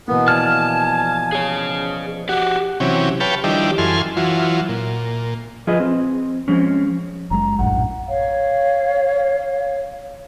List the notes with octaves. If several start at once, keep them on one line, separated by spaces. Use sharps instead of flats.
B2 E3 A#3 B3
F3 D5 G#5 A5 F6
G#4 C#5
F#4 G4 F#5
C3 E3 F#3 C#4 G4
G4 B4 C#5 F5 G5 A5
D#3 F3 G3 D4 E4 G4
F#2 E3 A4 G#5 C6 F6
E3 F#3 F4
A#2
F3 F4 G#4 B4 D#5
C4
F3 G#3 C4 C#4
F#1 F#3 G#3 A#5
A#1 F#2 A2 F#5
C#5 F5